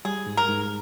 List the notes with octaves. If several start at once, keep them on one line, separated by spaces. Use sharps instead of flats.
G3 G#4
G#2
A#4
G#2